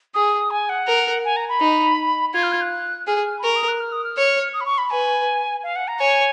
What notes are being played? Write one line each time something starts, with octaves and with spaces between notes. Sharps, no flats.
G#4 D#6
G#5
F#5
A#4
G#5
A#5
B5
D#4
F4 G#6
F6
G#6
F#6
G#4 F6
B5
A#4 C#6
D#6
F#6
F6
D#6
F6
C#5
D#6
B5
C#6
B5
B4 G#5
F5
F#5
A#5
C#5 G#5